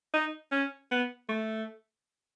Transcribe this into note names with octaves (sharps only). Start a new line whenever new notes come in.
D#4
C#4
B3
A3